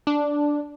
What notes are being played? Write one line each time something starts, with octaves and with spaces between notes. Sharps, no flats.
D4